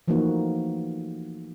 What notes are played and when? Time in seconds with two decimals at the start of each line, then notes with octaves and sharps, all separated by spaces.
0.08 E3 F3 A3 A#3 D#4 F#4